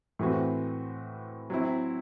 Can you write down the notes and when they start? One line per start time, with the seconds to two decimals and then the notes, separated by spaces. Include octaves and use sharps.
0.19 A2 E3 C4 F#4
1.50 F#3 C4 E4